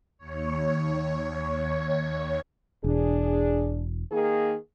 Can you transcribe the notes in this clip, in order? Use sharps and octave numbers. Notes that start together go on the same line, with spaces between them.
D#2 C#5
E1 D4 G#4
D#3 A#3 G#4